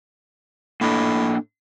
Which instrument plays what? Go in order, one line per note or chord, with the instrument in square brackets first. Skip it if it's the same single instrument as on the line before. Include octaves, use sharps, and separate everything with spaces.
[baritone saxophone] A2 [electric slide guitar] A#3 D4 D#5